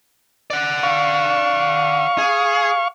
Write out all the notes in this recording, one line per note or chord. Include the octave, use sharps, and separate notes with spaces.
D5 F#5
F5 C#6
G#4